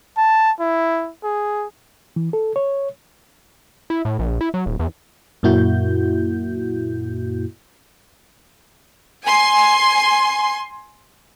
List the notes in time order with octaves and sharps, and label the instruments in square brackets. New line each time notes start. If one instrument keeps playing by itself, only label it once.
[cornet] A5
E4
G#4
[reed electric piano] E3
A4
C#5
[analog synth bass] E4
A2
A#1
E4
F#3
D#1
E2
[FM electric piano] F#2 A#2 A#3 E4 F#4 G6
[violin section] G#5 C6